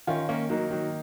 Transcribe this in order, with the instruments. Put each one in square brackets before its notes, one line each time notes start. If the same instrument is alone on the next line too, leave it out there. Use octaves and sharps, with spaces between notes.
[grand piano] D#3 [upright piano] C#4 F4
[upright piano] A#3 C#4
[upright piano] D#3 F#3 [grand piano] A#3 D#4
[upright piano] D#3 F#3